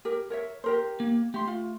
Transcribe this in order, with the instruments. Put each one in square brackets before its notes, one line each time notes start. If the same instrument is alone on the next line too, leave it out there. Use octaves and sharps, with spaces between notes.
[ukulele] G4 A#4
A#4 C#5 E5
G4 A#4 C5
[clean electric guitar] A#3
[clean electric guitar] A3 C6 [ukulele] G4
[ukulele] F4